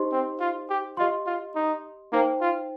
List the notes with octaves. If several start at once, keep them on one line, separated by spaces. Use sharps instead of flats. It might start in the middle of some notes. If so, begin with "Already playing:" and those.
Already playing: D#4 G4 C5 D#5 C6
C4
F4
G4
F4 G4 D#5 C6
F4
D#4
A#3 D#4 C5 G5
F4